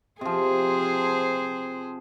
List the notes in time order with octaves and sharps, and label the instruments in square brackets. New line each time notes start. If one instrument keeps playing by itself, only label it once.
[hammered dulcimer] C3 F3 [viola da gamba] G#4 C5